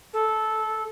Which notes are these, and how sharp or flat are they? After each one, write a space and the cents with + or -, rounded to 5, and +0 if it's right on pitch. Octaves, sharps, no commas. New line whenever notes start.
A4 -15